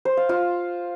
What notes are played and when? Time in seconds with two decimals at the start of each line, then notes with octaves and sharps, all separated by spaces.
0.05 C5
0.17 F5
0.29 F4